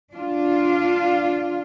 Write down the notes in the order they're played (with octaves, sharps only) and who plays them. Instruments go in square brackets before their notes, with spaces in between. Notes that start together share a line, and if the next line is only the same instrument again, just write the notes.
[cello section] D4 F4